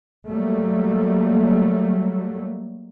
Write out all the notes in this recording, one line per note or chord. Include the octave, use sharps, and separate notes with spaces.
F#3 G3 A3 A#3